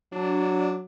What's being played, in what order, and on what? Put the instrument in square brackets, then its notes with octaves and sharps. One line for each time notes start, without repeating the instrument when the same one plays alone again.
[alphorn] F#3 [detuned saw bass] D4